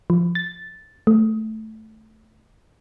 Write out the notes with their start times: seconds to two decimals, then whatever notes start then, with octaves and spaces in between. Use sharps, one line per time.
0.10 F3
0.35 A6
1.07 A3